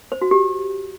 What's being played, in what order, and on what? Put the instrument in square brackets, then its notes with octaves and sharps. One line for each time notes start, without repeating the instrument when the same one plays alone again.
[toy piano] C5
F#4
G4